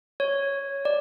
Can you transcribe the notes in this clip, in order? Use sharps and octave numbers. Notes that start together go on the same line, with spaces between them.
C#5
D5